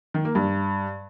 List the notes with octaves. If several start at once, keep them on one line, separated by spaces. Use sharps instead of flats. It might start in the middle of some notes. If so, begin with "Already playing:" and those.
D#3
A#3
G2